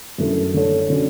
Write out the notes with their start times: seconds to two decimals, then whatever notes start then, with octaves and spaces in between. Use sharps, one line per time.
0.18 F#2 D3 A3 E4 A4
0.54 D3 A3 D4 A4 C#5
0.90 D3 F#3 C#4 F#4